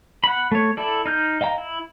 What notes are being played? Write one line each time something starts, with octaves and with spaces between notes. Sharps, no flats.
F#5 B5
A3 C#5
E4 A4 D5
D#4 F6 G6
D#5 F5 G5 A#5
E4